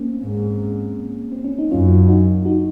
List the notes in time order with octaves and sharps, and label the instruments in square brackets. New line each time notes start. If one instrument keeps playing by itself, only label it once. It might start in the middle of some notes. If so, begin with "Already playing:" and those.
Already playing: [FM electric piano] A#3 C4 C#4
[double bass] G#2
[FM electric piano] C4
C#4
D#4
[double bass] F#2 [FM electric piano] C#4 F4
[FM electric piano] D#4 F#4
D#4 F#4